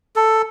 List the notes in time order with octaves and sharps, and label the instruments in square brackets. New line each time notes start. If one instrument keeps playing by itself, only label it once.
[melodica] A4